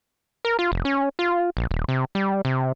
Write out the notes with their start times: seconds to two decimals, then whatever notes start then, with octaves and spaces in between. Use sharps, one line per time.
0.45 A#4
0.59 F4
0.72 F1
0.85 C#4
1.19 F4
1.57 A#1
1.71 D#1
1.88 C3
2.15 G3
2.45 C3